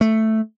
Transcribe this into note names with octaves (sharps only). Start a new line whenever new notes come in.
A3